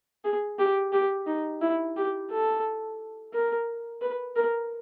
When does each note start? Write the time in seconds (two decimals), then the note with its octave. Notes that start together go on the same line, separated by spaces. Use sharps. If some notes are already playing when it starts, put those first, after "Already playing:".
0.24 G#4
0.59 G4
0.93 G4
1.27 D#4
1.61 E4
1.96 G4
2.30 A4
3.34 A#4
4.02 B4
4.36 A#4